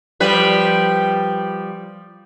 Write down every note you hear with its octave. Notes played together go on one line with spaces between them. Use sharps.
F3 G3 B4